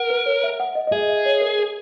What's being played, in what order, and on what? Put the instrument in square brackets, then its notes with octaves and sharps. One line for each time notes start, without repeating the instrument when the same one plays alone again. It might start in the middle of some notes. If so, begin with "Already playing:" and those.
Already playing: [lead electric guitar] A#4 [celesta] F#5
[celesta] B4
C#5
E5
F#5
D#5
D#5
[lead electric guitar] G#4 [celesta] E5
[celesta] E5
C#5
A#4
A#4